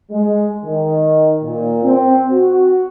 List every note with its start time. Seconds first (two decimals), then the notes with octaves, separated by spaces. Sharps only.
0.11 G#3
0.64 D#3
1.43 A#2
1.83 C4
2.31 F#4